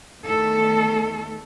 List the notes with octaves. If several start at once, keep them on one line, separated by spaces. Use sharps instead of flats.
E2 D#3 A3 A4